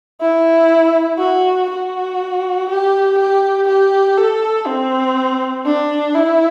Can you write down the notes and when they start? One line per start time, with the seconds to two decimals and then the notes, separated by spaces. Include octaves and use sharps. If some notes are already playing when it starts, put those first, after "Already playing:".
0.21 E4
1.19 F#4
1.70 F#4
2.69 G4
3.18 G4
3.68 G4
4.18 A4
4.67 C4
5.66 D4
6.15 E4